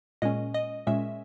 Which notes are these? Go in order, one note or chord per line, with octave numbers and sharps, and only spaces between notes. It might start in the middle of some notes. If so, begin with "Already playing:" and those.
A#2 G#3 C#4 D#5
D#5
A#2 G#3 C#4 E5